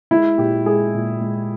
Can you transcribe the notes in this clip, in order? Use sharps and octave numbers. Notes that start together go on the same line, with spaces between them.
G#3 E4
A#2 G4
G#3 G#4
A#2
G#3